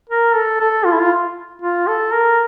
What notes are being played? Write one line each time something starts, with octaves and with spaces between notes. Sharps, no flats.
A#4
A4
A4
F4
E4
F4
F4
A4
A#4